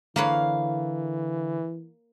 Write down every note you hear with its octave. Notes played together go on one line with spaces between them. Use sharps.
D3 E3 A#3 B4 C#5 F5